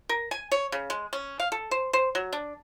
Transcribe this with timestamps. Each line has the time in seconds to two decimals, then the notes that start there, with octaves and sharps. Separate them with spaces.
0.09 A#4
0.31 G#5
0.52 C#5
0.72 C#3
0.90 G#3
1.13 C#4
1.40 F5
1.52 A4
1.71 C5
1.93 C5
2.15 F#3
2.33 D4